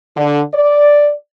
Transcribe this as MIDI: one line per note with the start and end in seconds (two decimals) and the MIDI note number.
0.16 0.42 50
0.54 1.13 74